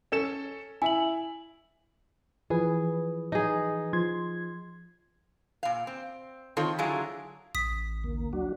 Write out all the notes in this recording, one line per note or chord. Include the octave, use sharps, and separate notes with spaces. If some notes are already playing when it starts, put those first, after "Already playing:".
C#4 A4 E7
E4 E5 G#5 F#7
E3 F3 G#4 B4
D#4 G#4
F3 C6 G#6
A#2 F5
C4
D#3 C4 F4 A4 C#5
D3 F#3 E4 F4 G#4
A1 D#6 B6
D2 A#3
F#3 D4 F#4